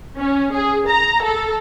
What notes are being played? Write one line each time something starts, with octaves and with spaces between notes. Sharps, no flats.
C#4
G#4
A#5
A4